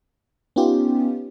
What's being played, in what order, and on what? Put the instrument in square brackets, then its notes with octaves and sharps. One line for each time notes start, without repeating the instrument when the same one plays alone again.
[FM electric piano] B3 C#4 D#4 F4 G4